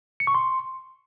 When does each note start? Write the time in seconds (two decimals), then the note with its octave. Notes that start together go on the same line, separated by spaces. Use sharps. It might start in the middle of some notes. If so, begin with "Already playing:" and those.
0.20 C#7
0.27 C#6
0.35 C6